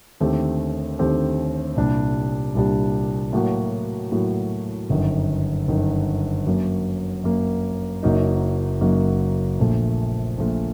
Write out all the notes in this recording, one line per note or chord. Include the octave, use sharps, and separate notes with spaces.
D#2 D3 A3 C4 G4
D#2 D3 A3 C4 G4
C2 A#2 G3 D4 G4
C2 A#2 G3 D4 G4
A2 F#3 A#3 F#4
A2 F#3 A#3 F#4
G1 F#2 D#3
G1 F#2 D#3
F#2 F#3 A#3
F#2 F#3 A#3
F#1 F#2 F#3 A#3 D#4
F#1 F#2 F#3 A#3 D#4
A#1 A#2 A3
A#1 A#2 A3